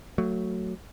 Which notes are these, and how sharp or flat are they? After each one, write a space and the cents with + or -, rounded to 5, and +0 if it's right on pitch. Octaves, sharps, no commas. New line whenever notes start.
F#3 +0 A3 +20